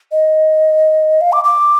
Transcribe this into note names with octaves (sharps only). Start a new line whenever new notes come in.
D#5
F5
D6
D6